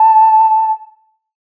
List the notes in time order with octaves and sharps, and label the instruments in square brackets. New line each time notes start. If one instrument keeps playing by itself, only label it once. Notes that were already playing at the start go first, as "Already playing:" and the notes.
Already playing: [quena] A5